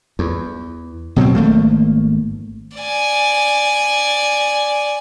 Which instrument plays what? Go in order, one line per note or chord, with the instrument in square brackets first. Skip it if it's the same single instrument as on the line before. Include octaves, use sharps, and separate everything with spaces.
[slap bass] E2
B2 F#3 G3 C4
G#1 A3 A#3
[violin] D5 G#5